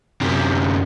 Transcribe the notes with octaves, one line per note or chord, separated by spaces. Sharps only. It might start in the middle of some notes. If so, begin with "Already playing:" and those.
F#2 C3